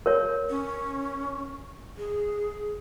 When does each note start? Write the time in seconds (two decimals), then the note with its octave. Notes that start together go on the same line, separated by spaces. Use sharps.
0.06 A#4 C#5
0.50 C#4
1.98 G#4